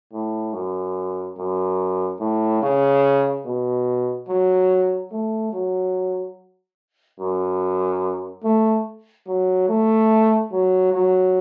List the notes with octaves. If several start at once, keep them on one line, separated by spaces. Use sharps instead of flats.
A2
F#2
F#2
A2
C#3
B2
F#3
A3
F#3
F#2
A3
F#3
A3
F#3
F#3